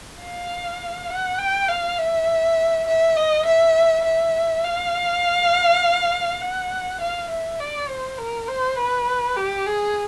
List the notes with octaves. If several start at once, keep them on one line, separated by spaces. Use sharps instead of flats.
F5
F#5
G5
F5
E5
E5
D#5
E5
E5
F5
F#5
F5
E5
D5
C5
A#4
C5
B4
G4
G#4